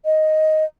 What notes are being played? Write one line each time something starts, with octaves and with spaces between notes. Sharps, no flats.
D#5